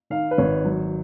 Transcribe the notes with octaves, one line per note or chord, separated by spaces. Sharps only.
D#3 F5
B4
G#1 C#5
F#3